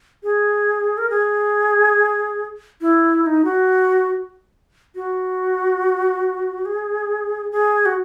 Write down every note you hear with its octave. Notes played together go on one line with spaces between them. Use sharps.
G#4
A#4
G#4
E4
E4
D#4
F#4
F#4
G#4
G#4
F#4